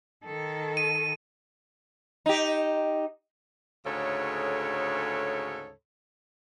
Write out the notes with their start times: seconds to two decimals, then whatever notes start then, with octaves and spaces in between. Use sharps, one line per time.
0.23 D#3 A4
0.77 D#7
2.26 D#4 G4
3.85 D2 G#2 C#3 A4 C#5